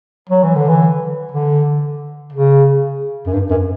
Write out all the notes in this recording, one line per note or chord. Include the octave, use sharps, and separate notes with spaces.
F#3
E3
D3
E3
D3
C#3
F#2
G2
F#2